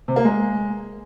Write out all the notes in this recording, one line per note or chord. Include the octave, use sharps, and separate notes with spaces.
C3
A#3
G#3